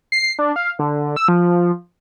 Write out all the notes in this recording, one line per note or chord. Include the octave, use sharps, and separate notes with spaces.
C7
D4
F5
D3
E6
F3